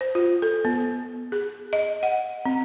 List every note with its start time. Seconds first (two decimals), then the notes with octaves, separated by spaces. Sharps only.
0.01 C5
0.15 F4
0.42 A4
0.65 B3
1.32 G#4
1.73 D#5
2.03 F#5
2.46 C4